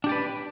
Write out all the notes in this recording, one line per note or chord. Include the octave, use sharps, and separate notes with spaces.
D4 G4 B4 D5